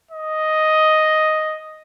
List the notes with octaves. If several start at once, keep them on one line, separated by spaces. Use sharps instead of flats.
D#5